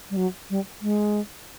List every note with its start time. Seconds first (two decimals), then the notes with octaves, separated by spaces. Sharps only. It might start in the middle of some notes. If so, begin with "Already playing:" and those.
0.10 G3
0.17 F#3
0.50 G3
0.81 G#3